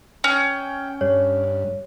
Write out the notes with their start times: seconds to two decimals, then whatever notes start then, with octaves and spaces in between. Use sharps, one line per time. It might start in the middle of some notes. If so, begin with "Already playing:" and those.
0.24 C#4 G5
1.01 G2 C#5